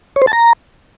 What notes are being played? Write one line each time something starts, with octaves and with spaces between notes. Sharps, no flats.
C#5
C5
A5
A#5